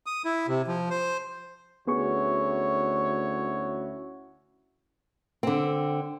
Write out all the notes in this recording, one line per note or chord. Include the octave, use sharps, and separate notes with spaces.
D#6
E4
C3
F3
C5
D2 B3 C#4 E4 F#4 G#4 C#5 C#6
D3 C4